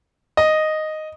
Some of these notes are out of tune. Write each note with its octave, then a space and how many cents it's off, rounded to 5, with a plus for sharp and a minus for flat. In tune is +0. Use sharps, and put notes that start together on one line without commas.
D#5 -5